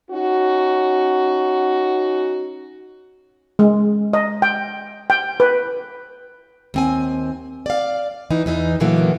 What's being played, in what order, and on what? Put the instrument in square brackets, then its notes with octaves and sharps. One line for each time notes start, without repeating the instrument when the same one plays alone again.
[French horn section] C#4 D#4 F#4
[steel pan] G#3
D#5
G5
G5
B4
[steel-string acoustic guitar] D#2 C4 G#5
D5 F5
E3 D#4
E2 E3 D#4
A#2 D3 E3 F#3 A#3 B3